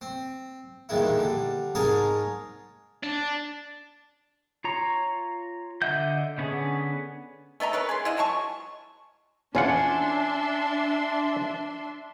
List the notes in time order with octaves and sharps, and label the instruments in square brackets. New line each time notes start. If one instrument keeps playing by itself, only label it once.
[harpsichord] C4
A#1 E2 D#3 G3 G#3 E4
D3 G3
G#2 G#4 A#4 C#5 G#5 A5
[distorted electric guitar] D4
[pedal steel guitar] F4 C#5 A#5 C#6
D3 D#5 E5 F#5 G6
D3 B3 C#4 G#4
[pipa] A3 B3 D#5 A#5
B3 A#4 B4 C#5
G#4 C6
E4 F4 D#5 F#5
F#3 G#3 A5 C#6
[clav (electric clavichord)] E2 F4 F#5 [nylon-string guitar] C#4 [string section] D4 E5 C6